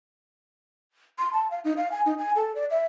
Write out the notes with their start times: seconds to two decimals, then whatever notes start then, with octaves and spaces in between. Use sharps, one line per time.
1.19 C6
1.33 A5
1.51 F5
1.64 D#4
1.77 F5
1.92 G#5
2.06 D#4
2.18 G#5
2.36 A4
2.55 D5
2.71 E5